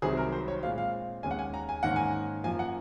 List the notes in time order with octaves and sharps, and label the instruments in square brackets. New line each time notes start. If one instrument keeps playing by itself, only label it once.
[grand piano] C2 C3 D#3 F#3 C4 G#4
A#4
C5
C#5
A#2 G#3 C4 F5
F5
D#2 C#3 G#3 C#4 G#5
F#5
G#5
A#5
G#5
G#2 D#3 A#3 C#4 F#5
G#5
F#2 F3 A#3 G#5
F#5